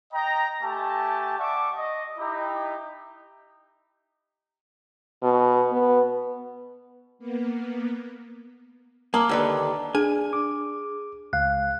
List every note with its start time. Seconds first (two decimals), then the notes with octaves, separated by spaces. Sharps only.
0.12 D#5 G5 A#5
0.63 A3 G4 G#5 A5
1.38 D5 E5 F#5 A5 C#6 D6
1.76 D#5
2.18 D#4 E4 G4
5.23 B2
5.72 B3
7.19 A#3 B3
9.14 A#3 A5 A#5 D6
9.29 D#2 D3 B4
9.95 D4 G#4 G#5
10.33 D6
11.33 C#2 F5 F#6